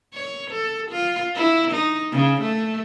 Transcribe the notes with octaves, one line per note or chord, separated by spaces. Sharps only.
C#5
A4
F4
E4
D#4
C#3
A3